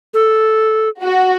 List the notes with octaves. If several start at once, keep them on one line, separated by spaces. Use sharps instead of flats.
A4
F#4